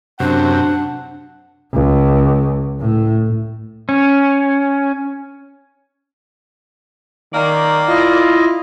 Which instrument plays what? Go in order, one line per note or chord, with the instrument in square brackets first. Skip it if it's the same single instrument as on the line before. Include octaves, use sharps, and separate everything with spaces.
[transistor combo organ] F#2 C3 [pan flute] D4 [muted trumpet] F#5
[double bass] C#2
A2
[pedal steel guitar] C#4
[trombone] D#3 [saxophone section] A#3 D#4 D5
[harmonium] E4 D#5 [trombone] F4